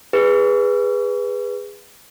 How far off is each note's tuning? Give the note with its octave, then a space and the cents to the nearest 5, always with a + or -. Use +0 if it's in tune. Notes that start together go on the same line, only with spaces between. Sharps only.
G#4 -15 B4 +0